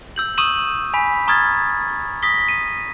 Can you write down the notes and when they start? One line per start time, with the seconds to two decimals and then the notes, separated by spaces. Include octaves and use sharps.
0.16 E6 G6 F#7
0.38 C#6 D#6 E6 D#7 E7 F#7
0.94 G#5 B5 B6
1.28 A#5 C#6 D#6 F6 G#6 A6
2.23 D#6 A#6 B6 G7
2.48 D#7